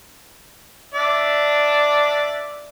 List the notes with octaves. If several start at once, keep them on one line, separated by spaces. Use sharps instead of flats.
D4 D5 E5